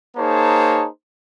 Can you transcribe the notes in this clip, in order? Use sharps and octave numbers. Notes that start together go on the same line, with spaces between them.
A#3 D#4 G#4 C5 C#5 A5